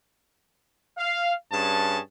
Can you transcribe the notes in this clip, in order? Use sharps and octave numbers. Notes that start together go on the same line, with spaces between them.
F5
G2 C#4 G#4 A5